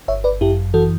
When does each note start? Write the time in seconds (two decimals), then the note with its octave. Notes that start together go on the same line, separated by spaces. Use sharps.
0.08 G1 C#5 E5
0.24 B4 D5
0.41 F#2 E4 G4
0.74 E3 F#4 A4